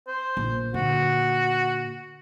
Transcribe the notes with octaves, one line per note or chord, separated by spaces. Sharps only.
C5
A#1
A#2 D3 F#4